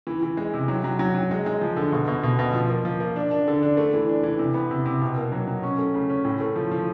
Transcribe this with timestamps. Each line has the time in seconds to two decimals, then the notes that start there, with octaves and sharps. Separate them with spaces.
0.07 E3
0.22 E3
0.37 G#3
0.53 C3
0.68 F#3
0.84 F#3
0.99 F#3
1.15 F#3
1.31 G#3
1.46 G#3
1.61 F3
1.76 D3
1.92 B2
2.08 B2
2.23 B2
2.39 B2
2.54 F3
2.69 A#3
2.85 F3
3.00 A#3
3.16 D4
3.31 D4
3.47 D3
3.63 D4
3.77 A3
3.93 E3
4.09 D4
4.24 E3
4.39 C3
4.54 B3
4.71 C3
4.85 C3
5.02 B2
5.17 A#3
5.32 F#3
5.48 F#3
5.63 C#4
5.79 A3
5.94 C#3
6.10 C#4
6.25 A2
6.40 A3
6.56 F3
6.71 F3